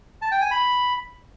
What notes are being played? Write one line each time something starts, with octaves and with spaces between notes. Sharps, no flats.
A5
G5
G#5
B5